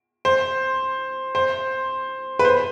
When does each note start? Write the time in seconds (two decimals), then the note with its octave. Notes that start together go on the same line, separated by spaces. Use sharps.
0.25 C5
1.35 C5
2.39 B4
2.45 C5